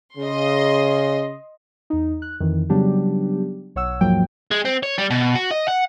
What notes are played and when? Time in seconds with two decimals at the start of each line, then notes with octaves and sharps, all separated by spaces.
0.17 C#3 D#5 C6
1.90 E2 D#4
2.22 F#6
2.40 F2 D#3 E3
2.70 C#3 F#3 G3 B3 D4 G4
3.76 B1 C#5 F#5 E6
4.01 D#2 G#2 F3 F#3 A#3 G5
4.51 G#3
4.65 C4
4.83 C#5
4.98 G3
5.11 B2
5.35 F#4
5.51 D#5
5.68 F#5